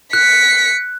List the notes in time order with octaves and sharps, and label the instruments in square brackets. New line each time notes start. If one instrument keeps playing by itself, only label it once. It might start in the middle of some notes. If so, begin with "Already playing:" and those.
[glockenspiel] F#6 [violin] B6 C#7